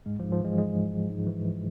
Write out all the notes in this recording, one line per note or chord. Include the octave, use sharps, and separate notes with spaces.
G#2 G#3
F3
G#2
F3
E3 G#3
G#2 G#3
G#2
G#2
G#2
E3
E3